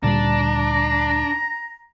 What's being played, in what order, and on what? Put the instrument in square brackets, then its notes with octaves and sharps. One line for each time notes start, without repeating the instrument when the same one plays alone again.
[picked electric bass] D2 A#2 G3 [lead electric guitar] D4 [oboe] A#5